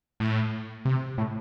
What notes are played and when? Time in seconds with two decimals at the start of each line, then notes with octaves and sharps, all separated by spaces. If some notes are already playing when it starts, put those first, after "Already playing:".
0.20 A2
0.85 C3
1.18 A2